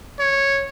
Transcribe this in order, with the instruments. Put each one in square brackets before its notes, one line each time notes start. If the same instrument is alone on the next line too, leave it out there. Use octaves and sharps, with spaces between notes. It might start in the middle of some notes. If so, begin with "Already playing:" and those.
[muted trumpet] C#5